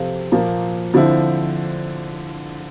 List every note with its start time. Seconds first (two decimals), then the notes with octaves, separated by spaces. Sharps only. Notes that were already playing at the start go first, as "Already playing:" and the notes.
Already playing: C3 F3 C4 F4 A4
0.32 A#2 F3 A#3
0.94 D3 F3 C4 E4